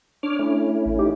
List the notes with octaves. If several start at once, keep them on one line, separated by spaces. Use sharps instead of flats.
D4 C#5 D6 F6
A3 C#4 E4
A1
D#4 G4 D6